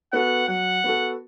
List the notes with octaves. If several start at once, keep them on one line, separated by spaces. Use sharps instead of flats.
B3 F#4 A4 F#5
F#3 F#5
B3 F#4 A4